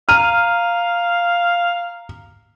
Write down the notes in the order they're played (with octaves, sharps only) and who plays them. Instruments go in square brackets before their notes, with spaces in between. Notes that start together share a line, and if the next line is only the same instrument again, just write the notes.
[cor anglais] F5 [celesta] A#5 D#7 [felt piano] F6